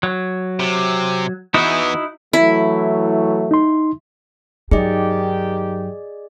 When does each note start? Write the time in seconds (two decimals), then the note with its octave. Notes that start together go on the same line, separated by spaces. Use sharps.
0.03 F#3
0.59 C3
1.54 E3 B3 D#4 E4 F#4
2.33 E3 F#3 A3 E4
3.51 D#4 C6
4.71 G2 D#3 F#3 D#4 G4 G#4 D5 D#5